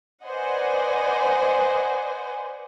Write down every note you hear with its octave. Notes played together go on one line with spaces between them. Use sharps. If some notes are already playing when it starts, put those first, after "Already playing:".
B4 C5 D5 D#5 F#5 G#5